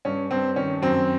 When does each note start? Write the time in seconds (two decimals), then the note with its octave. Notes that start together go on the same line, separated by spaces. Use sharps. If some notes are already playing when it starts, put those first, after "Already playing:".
0.05 G2 C#4
0.31 G2 C4
0.56 D#3 C#4
0.82 F#2 C4